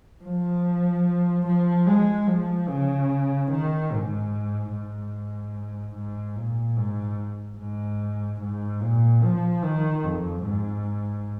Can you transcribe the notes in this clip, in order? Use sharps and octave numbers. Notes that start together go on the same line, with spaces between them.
F3
F3
G#3
F3
C#3
D#3
G#2
G#2
G#2
A#2
G#2
G#2
G#2
A#2
F3
D#3
F2
G#2